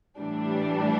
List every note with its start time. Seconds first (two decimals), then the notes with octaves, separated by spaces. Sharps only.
0.20 A2 E3 G3 D4